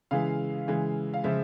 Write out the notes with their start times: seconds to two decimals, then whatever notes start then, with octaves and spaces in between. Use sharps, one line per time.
0.11 C#3 E3 G#3 F5
0.67 C#3 E3 G#3
1.14 F5
1.24 C#3 F3 G#3 E5